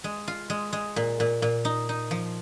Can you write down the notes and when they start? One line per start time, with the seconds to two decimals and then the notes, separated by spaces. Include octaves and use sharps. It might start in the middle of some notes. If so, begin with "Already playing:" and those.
0.04 G#3
0.28 F4
0.50 G#3
0.73 G#3
0.96 A#2
1.20 A#2
1.42 A#2
1.65 D#4
1.89 D#4
2.11 F3